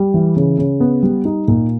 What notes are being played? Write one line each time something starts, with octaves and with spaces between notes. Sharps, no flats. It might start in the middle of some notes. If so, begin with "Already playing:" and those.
Already playing: G3
E3
C#3
C#3
B3
G3
D#4
A#2